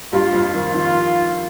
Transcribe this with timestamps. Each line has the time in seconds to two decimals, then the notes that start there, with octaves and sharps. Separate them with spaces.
0.13 G2 G3 F4
0.33 F2 F3
0.44 F4
0.54 D#3
0.74 D#3 F4